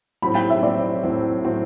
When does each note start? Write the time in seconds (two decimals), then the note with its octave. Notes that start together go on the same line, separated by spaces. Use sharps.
0.22 A2 F#3 C4 B5
0.35 G5
0.50 E5
0.63 A2 F#3 C4 D5
1.03 A2 F#3 C4
1.45 A2 F#3 C4